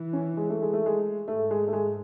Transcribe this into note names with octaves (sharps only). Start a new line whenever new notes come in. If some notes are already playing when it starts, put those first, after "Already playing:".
Already playing: E3
C#4
G#3
A3
G#3
A3
G#3
G#2 A3
G#3
A3
G#3